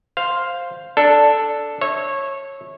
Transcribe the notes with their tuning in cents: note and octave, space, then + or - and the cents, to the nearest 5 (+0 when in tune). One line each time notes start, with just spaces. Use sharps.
C5 +0 F5 +0
D4 +0 A4 +0
C#5 -20 E5 -15